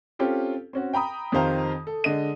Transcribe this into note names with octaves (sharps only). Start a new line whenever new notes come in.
C4 C#4 F4 G4 A4
C4 C#4 F#4
G5 A#5 B5 D#6
F2 D#3 G4 C5 F5 A#5
A4
D3 G#3 D#5 D#7